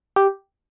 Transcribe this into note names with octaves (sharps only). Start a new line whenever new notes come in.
G4